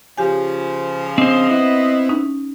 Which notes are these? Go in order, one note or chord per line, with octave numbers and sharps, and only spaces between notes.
C#3 F3 G4 G#5
C4 D4 C5 D#5
B3 E4
C#4 D#4